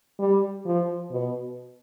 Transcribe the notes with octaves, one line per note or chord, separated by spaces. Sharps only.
G3
F3
B2